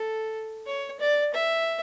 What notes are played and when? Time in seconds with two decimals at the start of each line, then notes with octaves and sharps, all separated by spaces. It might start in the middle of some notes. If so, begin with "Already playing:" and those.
Already playing: A4
0.66 C#5
0.99 D5
1.33 E5